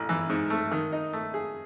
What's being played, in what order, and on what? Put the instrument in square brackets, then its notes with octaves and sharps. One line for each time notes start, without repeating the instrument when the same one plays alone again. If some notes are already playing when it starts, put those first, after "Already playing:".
Already playing: [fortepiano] A1
E3
G#2
A3
D#3
D#4
A3
G#4